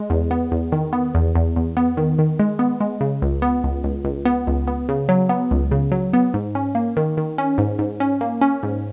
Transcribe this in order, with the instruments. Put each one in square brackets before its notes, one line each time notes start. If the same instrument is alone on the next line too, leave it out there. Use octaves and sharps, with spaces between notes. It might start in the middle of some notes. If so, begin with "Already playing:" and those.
Already playing: [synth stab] G#3
E2
B3
E2
D#3
B3
E2
E2
E2
B3
D#3
D#3
G#3
B3
G#3
C#3
C#2
B3
C#2
C#2
C#2
B3
C#2
B3
C#3
F#3
B3
C#2
C#3
F#3
B3
G#2
C#4
A#3
D#3
D#3
C#4
G#2
G#2
C#4
A#3
C#4
G#2